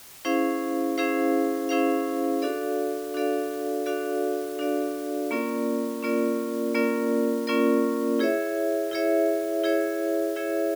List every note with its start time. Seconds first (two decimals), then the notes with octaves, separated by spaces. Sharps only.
0.25 C#4 E4 G#4 C5 F5
0.98 C#4 E4 G#4 C5 F5
1.69 C#4 E4 G#4 C5 F5
2.42 D4 F#4 A4 D5 F5
3.14 D4 F#4 A4 D5 F5
3.86 D4 F#4 A4 D5 F5
4.59 D4 F#4 A4 D5 F5
5.31 A#3 C#4 F4 A#4 D5
6.03 A#3 C#4 F4 A#4 D5
6.75 A#3 C#4 F4 A#4 D5
7.47 A#3 C#4 F4 A#4 D5
8.19 E4 G#4 C#5 E5
8.91 E4 G#4 C#5 E5
9.64 E4 G#4 C#5 E5
10.36 E4 G#4 C#5 E5